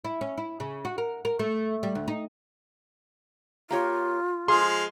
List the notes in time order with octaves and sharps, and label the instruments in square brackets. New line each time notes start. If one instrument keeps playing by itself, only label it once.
[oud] E4
C#4
E4
C#3
F#4
A#4
A#4
A3
G3
D2
D#4
[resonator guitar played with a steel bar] A#3 G4 C#5 [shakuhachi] F4
[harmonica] F3 G#3 F5 [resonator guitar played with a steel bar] G#4 [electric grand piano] C6